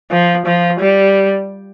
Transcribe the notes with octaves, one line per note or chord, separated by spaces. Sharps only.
F3
F3
G3